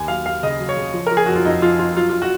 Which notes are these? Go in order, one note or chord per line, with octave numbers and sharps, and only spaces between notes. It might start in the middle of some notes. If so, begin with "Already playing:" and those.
Already playing: D#2 G#5
F#3 F5
D#2 F5
C#3 D#5
F#3
C#5
C#3
F3
F3 A#4
G#4
F2 F#4
F4
F2 D#4
F3 F4
F2 F4
F#3 F4
F4
F#4